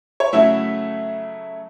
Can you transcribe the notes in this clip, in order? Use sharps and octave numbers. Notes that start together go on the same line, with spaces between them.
C#5
C#3 F#3 A3 E4 E5